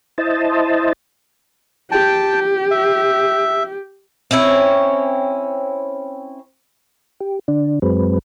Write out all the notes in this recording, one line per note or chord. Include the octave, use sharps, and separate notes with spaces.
E4 C5 D#5 A5
G4 G5 A5
E5
C4 C#4 E4 C#5
G4
D3 D4
F#2 F#3 G#3 C4 B4